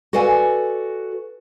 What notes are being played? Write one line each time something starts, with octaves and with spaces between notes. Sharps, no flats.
F#4 A4 B4 D5 F5 G#5